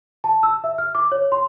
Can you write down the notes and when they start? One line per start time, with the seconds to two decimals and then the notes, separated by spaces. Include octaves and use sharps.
0.24 A5
0.43 E6
0.64 E5
0.78 F6
0.95 D6
1.12 C#5
1.32 C6